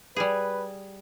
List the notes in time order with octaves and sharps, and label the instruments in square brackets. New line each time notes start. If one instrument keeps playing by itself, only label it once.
[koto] G3 G#4 [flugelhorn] B4